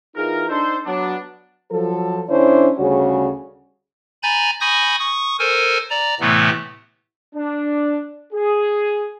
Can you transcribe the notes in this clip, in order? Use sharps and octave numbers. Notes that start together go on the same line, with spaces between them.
E3 D#4 F4 G#4 A#4
D4 D#4 A4 C5
F#3 B3 D4
F3 F#3 A4
D3 C#4 D4 E4 C5 C#5
D2 C#3 G3 F#4 G#4 C#5
G#5 A#5 B5 G6 A6
G#5 B5 C#6 D#6 G6 A#6
C#6 D#6
A4 A#4 C5 G#5
D5 A#5
A2 C3 E3 A3 B3
D4
G#4